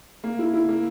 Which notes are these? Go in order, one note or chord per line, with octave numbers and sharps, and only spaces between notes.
A#3
E4
E4
A#3